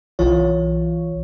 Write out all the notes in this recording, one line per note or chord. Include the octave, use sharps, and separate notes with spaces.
B1 E3 F4 C#5